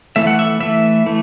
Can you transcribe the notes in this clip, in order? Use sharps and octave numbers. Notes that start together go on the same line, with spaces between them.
E3 A3 E5
F#5
E5
E3 A3 E5
E3 A3